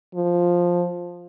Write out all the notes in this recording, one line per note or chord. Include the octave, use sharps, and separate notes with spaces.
F3